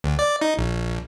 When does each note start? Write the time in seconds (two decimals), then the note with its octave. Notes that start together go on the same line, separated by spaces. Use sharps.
0.04 D2
0.19 D5
0.41 D#4
0.57 A#1